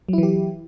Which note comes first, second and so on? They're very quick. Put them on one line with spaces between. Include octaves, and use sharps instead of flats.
F#3 E4 E3 G4